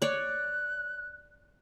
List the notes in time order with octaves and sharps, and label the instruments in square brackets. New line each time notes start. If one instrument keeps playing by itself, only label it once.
[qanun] C#5 D5 [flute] F#6